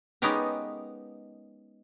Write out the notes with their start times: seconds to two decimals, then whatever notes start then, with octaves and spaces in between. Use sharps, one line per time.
0.22 G#3 B3 C#4 D#4 G4 A#4